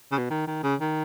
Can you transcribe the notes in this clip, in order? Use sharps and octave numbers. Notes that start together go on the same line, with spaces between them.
C#3
B2
D#3
D#3
C#3
D#3